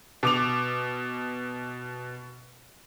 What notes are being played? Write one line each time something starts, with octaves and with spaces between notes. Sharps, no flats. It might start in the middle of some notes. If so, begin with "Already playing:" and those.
B2 D6 F7